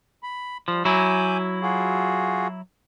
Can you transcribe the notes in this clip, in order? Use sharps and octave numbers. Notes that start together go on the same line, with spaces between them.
B5
F3 G3
F#3 E4 G#5 D6 G6
F4 F#4 G#4